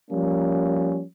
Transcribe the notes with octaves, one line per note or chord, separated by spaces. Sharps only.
F3 G3 A#3 C#4